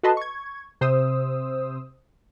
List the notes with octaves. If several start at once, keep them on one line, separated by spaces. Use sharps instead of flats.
F#4 A4 B4 D#5 A5 C6
C#6 G#6
C3 C5 D#6 E6